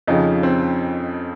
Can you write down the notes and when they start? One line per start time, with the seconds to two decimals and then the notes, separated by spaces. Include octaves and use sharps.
0.07 F2 C#3 F3 D#4
0.43 C4